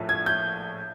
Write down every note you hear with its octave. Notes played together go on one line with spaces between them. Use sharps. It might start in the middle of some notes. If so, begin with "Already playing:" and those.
Already playing: A#1 A2 F3 A3
G#6
G6